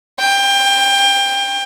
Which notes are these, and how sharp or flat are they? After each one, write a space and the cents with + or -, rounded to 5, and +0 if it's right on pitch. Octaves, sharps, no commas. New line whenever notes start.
G5 +25